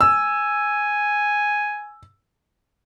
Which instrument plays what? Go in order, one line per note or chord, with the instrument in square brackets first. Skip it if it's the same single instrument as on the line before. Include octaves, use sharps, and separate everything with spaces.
[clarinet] G#5 [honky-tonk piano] E6